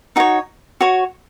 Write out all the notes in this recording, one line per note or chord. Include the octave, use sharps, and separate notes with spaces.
D#4 F#4 C#5
F#4 C#5